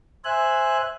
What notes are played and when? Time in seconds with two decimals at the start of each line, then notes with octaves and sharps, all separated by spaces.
0.25 C5 E5 G#5 F#6